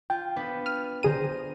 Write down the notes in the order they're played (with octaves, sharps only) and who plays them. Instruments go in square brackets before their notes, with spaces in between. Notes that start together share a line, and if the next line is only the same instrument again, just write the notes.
[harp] F4 [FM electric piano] G5
[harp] B3 D4 B4
[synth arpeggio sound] F6 D#7
[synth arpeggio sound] D3 G#4 D#7 [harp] C5 A#5